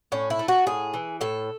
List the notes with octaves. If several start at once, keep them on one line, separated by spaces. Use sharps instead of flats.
A2 C#4
E4
A3
F#4
A2 G#4
E3
A2 A4